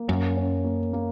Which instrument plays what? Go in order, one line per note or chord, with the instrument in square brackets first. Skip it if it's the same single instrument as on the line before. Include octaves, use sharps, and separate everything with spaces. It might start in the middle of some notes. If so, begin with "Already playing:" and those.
Already playing: [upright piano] A#3
[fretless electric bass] F#2 [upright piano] C#4
[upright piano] C#4
A#3
A#3